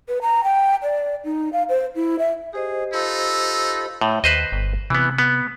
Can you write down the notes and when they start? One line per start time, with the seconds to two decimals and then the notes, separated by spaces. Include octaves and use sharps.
0.08 B4
0.22 A#5
0.44 G5
0.83 D5
1.25 D#4
1.53 F5
1.69 C5
1.95 E4
2.19 E5
2.53 G4 G#4 C5 D#5
2.93 D#4 F4 A4 B5 E6
4.01 A2
4.24 D#2 B4 C5 D#5
4.52 G1
4.90 C3 E3 B3
5.18 B3